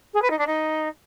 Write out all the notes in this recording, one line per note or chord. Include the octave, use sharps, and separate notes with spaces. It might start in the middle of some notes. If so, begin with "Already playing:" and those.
G#4
B4
D#4
D4
D#4